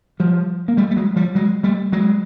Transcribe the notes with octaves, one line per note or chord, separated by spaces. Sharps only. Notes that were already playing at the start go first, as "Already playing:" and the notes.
F3 G3
A#3
G3 A3
A3
F#3 G#3
F3 G3
F#3 G#3
G3 A3
F#3 G#3